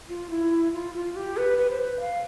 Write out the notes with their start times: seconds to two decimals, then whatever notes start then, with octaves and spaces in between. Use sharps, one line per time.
0.09 F4
0.30 E4
0.73 F4
0.95 F4
1.16 G4
1.37 B4
1.58 B4
1.70 C5
1.79 B4
2.00 F5